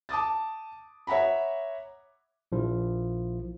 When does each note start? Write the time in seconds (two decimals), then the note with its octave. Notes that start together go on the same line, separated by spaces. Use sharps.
0.09 A5 D6 D#6 A6
1.07 C#5 E5 F#5 A#5 B5
2.52 A#1 F3 E4